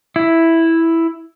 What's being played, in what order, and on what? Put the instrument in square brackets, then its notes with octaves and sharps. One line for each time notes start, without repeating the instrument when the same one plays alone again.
[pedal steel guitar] E4